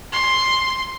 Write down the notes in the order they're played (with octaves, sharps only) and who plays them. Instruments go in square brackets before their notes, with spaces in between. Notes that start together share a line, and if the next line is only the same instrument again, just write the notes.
[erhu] C6